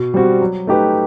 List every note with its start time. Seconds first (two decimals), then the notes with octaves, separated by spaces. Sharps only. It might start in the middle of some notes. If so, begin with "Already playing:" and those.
Already playing: B2
0.14 G3 C4 F#4
0.41 F#3
0.67 A3 D#4 G4 B4